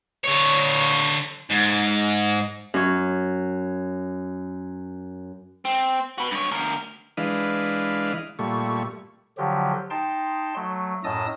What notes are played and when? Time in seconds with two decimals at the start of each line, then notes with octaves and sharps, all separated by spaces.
0.24 D3 C#5
1.50 G#2
2.74 F#2 C#5
5.65 C4
6.18 F#4 B4
6.31 G2 C#5
6.52 D2 A#4
7.17 E3 G#3 D4 B4 D#5 F5
8.39 A#2 G3 A3 C#6
9.38 D3 F3 F#3 G4
9.90 D#4 G5 A5 C6
10.56 F#3 A3
11.04 F#2 A2 D#5 A5 D#6 E6